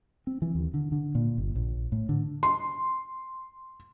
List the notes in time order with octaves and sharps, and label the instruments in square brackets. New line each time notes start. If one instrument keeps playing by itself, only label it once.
[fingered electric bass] C4
E3
D#2
D3
D3
A#2
G1
A#1
A2
D3
[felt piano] C6